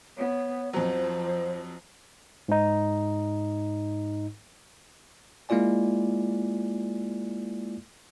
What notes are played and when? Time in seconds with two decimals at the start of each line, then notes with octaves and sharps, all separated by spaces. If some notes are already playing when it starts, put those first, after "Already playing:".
0.18 B3 C#5
0.73 F2 F3 F#3 C5
2.48 G#2 D#4
5.49 G#3 A#3 E4 F4 D5 G#5